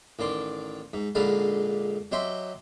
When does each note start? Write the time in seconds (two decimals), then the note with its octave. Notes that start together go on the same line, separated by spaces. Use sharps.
0.19 A1 D#3 D5 C6
0.93 G#2
1.15 A#1 G#2 D3 B4 F5 A5
2.12 F#3 G4 D#5 E5 C6